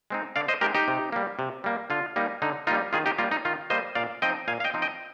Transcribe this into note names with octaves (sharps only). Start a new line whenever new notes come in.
G#3 C4 D#4
D3 D5 F5
C5 D#5
G#3 C4 D#4 G4 A#4
D#4 G4
C3
G3 A#3
C3
G3 A#3
D3 F4
G3 A#3 D#4
D3 D#4
G3 A#3 D#4 F4
D#3 F4 G#4
D#4 G4
G3 A#3 F4
D#4
D#3 F4
G3 A#3 C5 D#5
A#2 D5 F5
F3 C4 D#4 D#5 G5
A#2 F5 G#5
F5
D#5 G5
F3 C4 D#4
D#5 G5